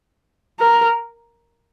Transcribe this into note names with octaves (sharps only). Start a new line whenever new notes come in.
A#4